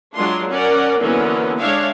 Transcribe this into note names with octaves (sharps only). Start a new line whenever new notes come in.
F#3 G#3 D4 F4 C6
C#4 A#4 D5 F#5
D3 E3 F#3 A#3 B3 C#4
G#3 D4 C#5 E5 F5